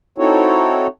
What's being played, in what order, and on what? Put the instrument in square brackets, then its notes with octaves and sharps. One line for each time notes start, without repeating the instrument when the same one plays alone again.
[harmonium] C4 D#4 E4 F#4 A4 C#5